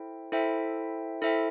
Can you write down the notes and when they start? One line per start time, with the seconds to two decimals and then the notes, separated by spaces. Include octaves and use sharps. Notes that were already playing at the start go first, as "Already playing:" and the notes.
Already playing: E4 A4 C5 E5 G5
0.32 E4 A4 C5 E5 G5
1.22 E4 A4 C5 E5 G5